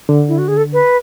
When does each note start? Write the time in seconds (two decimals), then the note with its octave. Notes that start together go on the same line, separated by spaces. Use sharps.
0.09 D3
0.28 E4
0.38 F#4
0.48 G#4
0.57 A4
0.73 B4